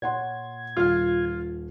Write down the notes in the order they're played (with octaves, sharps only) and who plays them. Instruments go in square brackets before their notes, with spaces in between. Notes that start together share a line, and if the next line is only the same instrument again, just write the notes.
[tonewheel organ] A#2 G#6 [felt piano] C#5 F#5 C6
[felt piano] D#1 [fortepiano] F4 F5